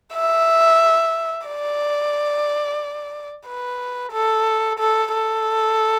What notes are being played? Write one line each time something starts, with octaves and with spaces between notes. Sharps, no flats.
E5
D5
B4
A4
A4
A4